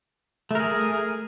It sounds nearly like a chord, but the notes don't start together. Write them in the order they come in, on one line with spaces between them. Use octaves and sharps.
A3 A#4 G#4